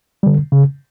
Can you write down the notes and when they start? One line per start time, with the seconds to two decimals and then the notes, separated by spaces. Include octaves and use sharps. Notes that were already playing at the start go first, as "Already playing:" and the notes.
0.23 D3 G3
0.52 C#3